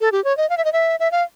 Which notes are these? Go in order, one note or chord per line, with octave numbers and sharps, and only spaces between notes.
A4
G4
C#5
D#5
F5
E5
D#5
E5
E5
F5